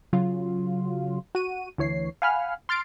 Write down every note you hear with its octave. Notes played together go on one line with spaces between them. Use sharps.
C#3 F#3 F4
F#4 D#7
D2 E3 C#5 C7
F5 F#5 G#5 B5 F6
C6 F6 A6 C7 D7